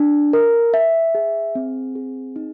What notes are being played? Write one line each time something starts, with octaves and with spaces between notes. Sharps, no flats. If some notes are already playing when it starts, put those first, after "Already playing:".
Already playing: D4
A#4
E5
G#4
C4
G#4
D#4